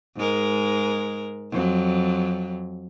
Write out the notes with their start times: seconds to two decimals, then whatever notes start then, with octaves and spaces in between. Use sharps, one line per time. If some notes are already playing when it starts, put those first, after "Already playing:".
0.16 G#2 G#3 A#4
1.52 F2 F#3